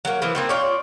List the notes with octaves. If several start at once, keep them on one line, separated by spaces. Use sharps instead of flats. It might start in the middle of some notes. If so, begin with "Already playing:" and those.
F#3 A#3
E3 F3 A#3
A#3 C4 D#4
F4 C#5 D5